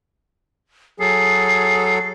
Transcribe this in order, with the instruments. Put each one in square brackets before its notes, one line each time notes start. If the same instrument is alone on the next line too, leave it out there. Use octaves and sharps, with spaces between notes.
[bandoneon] F#3 A4 [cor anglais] G#4 [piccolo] C7